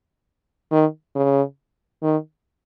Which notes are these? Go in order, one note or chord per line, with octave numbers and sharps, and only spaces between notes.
D#3
C#3
D#3